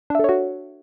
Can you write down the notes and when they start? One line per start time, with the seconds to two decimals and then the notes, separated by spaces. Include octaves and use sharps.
0.10 D4
0.15 E5
0.19 A4
0.24 C#5
0.29 F#4